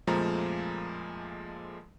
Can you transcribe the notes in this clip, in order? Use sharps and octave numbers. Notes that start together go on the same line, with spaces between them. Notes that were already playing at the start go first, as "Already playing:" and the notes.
F2 A#2 F3 G#3 A3 A#5